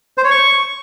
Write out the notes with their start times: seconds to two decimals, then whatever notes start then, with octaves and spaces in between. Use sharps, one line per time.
0.18 C5
0.24 C#5
0.31 C#6